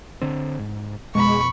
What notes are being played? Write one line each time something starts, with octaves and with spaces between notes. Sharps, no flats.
D3 C4
G#2
F2 B2 G#3 B5 C#6